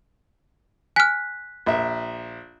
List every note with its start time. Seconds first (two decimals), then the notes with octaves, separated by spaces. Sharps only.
0.96 G#5 F6 F#6 B6
1.66 A#1 E5